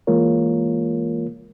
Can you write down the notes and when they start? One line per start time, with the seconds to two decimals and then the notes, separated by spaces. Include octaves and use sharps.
0.07 E3 G#3 A#3 F4 A#4 C#5